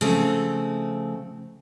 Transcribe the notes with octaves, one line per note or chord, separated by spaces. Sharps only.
C#3 F3 A3 C4